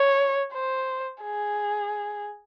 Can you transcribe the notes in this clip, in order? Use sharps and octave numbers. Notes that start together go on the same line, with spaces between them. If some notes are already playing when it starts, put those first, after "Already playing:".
Already playing: C#5
C5
G#4